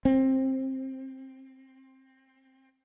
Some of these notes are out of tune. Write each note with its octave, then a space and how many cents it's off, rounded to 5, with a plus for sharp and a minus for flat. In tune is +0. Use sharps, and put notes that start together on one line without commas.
C4 +15